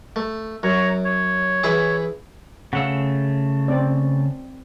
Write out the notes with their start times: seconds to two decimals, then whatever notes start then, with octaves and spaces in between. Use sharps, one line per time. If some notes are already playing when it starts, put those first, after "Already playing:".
0.16 A3
0.63 F#2 C#5 A#5 C#6
1.04 C#5
1.64 E3 E4 G#4
2.73 C#3 A3 F5 F#5 E6
3.68 C4 D5